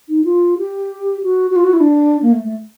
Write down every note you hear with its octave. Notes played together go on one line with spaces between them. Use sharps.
D#4
F4
G4
F#4
F#4
F4
F#4
E4
D4
A#3
A3
A3